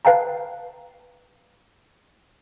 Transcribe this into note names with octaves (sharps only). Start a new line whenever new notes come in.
B4 F5 G5 A5 A#5